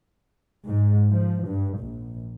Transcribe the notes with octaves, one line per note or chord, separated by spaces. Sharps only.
G#2
F3
G2
A#1